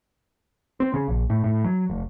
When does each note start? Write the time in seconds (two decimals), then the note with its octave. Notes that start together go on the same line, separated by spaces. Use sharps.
0.80 C4
0.94 C#3
1.08 A#1
1.30 A2
1.44 A2
1.64 F#3
1.90 F1